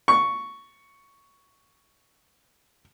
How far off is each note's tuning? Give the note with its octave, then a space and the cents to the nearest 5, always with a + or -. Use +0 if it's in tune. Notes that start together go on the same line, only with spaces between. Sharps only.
C#6 +5